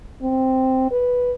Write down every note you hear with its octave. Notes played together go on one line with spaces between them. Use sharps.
C4
B4